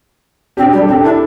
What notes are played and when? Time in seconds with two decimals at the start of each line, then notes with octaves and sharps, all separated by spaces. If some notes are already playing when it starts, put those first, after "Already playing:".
0.57 C4 D4 G4
0.72 G3 D4 G4
0.82 A4
0.88 C4 D4 G4
1.03 D4 E4 A4